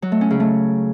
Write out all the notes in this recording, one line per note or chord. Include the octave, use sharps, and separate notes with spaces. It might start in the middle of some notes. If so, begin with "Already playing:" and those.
F#3
A3
C#4
C#3
A3